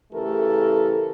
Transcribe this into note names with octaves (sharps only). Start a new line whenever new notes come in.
C#3 E3 A3 G4 A4 A#4